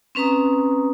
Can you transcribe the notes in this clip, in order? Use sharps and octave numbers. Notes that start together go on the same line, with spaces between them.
C4 C#4 B4 A#5 D#6